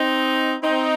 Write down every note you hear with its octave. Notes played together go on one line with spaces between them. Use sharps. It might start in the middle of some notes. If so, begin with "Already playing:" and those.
Already playing: C4 D#4
C4 D#4